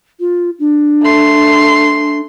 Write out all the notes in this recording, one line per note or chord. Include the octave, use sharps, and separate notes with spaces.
F4
D4
A3 C6